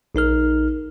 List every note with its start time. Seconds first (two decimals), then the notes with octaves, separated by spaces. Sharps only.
0.15 A#1 D#4 A#4 F6